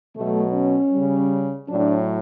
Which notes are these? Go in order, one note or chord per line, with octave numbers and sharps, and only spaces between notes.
B2 F#3 A3
C#4
C#3 G3
A2 F#3 D4